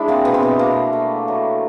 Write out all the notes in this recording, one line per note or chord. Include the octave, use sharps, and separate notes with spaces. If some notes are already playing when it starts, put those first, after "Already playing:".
Already playing: G#3 D4 E4
A#3 C4
B2 B3
C4
B3
B2 A#3
A3
F#3